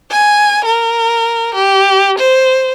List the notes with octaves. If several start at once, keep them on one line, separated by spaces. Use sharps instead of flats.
G#5
A#4
G4
C5